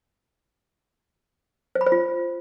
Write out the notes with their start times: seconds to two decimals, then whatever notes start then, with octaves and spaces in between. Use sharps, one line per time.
1.75 C5
1.81 B5
1.86 C5
1.92 F4